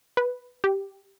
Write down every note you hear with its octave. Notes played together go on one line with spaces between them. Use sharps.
B4
G4